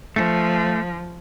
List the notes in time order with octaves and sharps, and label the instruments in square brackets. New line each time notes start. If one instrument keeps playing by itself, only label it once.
[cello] F3 [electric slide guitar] A3